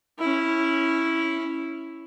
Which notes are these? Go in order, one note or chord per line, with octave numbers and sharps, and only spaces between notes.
C#4 E4